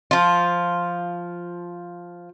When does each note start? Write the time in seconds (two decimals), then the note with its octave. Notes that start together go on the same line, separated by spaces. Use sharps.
0.11 F3 F4